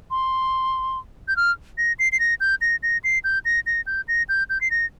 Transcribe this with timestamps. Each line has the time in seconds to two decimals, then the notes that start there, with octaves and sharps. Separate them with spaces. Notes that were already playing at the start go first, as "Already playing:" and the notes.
0.10 C6
1.28 G6
1.36 F6
1.78 A#6
1.99 C7
2.12 C7
2.20 A#6
2.40 G6
2.61 A#6
2.83 A#6
3.04 C7
3.24 G6
3.45 A#6
3.66 A#6
3.87 G6
4.08 A#6
4.29 G6
4.50 G6
4.61 C7
4.71 A#6